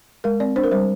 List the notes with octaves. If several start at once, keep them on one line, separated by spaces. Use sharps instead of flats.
G#3 A#4
C4 D5
D4 C5
A#4
G3 C5